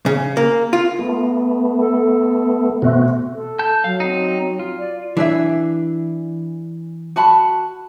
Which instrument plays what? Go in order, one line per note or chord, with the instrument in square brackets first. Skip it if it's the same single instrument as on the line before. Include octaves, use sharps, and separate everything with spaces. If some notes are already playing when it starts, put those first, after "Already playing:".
[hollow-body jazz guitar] C#3
A#3
F4
[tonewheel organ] A3 B3
[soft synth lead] A4
[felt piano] B2 A3 E5 [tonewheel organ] C4 F#4
[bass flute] A4
[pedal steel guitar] A5 G6
[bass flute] F#3 [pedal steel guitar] F5
[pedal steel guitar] C4 D#4
F4
[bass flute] D5
[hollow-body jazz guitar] E3 [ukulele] D4 G#4 E5
[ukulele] F#4 A5 B5